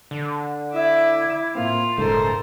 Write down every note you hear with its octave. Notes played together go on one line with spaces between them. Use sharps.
D3
E4 E5 D6
A2 A#3 C4 F4 F5
D#1 G#2 C#3 G#3 A4 A#4 C5